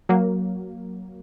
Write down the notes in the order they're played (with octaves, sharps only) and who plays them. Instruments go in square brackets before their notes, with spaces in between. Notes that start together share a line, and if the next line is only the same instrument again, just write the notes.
[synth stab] F#3 A#3